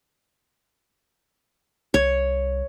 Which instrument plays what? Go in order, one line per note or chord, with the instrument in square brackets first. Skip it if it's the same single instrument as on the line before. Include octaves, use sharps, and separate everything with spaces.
[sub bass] C2 [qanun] C#5